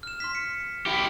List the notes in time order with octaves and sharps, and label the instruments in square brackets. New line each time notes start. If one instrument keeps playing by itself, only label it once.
[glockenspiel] F6 E7
C6 F6 B6
C#7
[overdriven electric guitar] E4 G4